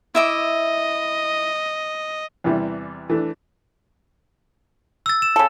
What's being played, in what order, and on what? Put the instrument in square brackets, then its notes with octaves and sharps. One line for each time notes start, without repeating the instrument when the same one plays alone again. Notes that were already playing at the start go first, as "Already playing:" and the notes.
[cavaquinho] E4 E5 D6 [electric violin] D#5
[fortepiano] E2 C3 E3 G3
E3 A3 D4
[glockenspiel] E6 A6
E7
[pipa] C#3 A4